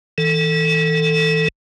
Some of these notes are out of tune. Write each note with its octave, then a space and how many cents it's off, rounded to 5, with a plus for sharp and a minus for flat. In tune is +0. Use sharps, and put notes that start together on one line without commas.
E3 -35 A4 +15